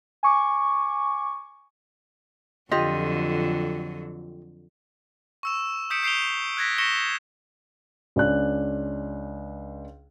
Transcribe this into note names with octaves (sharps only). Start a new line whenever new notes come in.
G#5 C#6 D6
F2 D3 F#3 F4 G4 D#5
C#6 E6 E7
D#6 G6 B6 C#7 D7 E7
G6 C7 D7 F7 G7
F#6 G#6 A#6 B6
C#6 A#6 B6 C#7 E7 G7
C#2 C#4 D4 D5 F#6